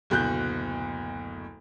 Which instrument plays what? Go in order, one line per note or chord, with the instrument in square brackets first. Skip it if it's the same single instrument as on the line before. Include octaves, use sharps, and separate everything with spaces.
[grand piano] F#1 D2 B2 F#6 G6